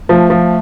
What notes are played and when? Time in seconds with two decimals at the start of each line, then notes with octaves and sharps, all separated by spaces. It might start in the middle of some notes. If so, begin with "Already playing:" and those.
0.09 F3 A3
0.30 F3